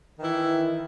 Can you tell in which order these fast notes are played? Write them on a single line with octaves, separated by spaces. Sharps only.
D#3 E3 E4